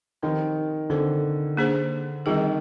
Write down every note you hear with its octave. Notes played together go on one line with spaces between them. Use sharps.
D#3 F3 C4 D#4 G4 C5
D3 C4 F4 C5
A#3 D4 G#4 C5
D#3 G3 C4 F4 G#4